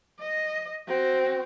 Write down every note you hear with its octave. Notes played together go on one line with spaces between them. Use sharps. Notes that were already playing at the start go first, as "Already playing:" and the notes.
D#5
C4 F#4